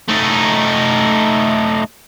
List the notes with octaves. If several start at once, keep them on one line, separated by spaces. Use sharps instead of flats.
A3 D#4